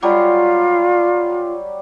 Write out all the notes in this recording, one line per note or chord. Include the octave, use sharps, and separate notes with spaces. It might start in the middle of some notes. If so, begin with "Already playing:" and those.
F#3 G3 F4